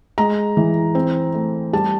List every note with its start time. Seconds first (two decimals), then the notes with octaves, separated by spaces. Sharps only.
0.18 G#3 A#5
0.57 E3
0.95 C4
1.34 A3
1.73 G3 A5